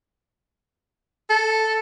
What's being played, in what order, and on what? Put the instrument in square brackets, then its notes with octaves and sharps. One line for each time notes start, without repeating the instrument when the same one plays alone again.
[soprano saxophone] A4